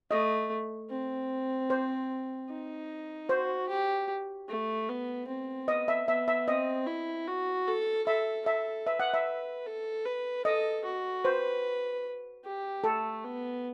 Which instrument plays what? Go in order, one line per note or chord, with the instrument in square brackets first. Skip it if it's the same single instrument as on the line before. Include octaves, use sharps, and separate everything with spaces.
[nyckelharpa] A3 [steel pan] D#5
[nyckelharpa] C4
[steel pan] C5
[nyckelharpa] D#4
[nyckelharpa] F#4 [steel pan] C5
[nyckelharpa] G4
A3
B3
C4
[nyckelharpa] B3 [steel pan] D#5
[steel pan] E5
[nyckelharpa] B3 [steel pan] E5
[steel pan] E5
[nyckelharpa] C4 [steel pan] D#5
[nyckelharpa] E4
F#4
A4
[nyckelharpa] A4 [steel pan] E5
[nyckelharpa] A4 [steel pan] E5
[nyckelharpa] B4 [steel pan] E5
[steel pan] F#5
E5
[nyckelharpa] A4
B4
[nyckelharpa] A4 [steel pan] D#5
[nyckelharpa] F#4
[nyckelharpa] B4 [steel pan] C5
[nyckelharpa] G4
[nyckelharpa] A3 [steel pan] A4
[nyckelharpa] B3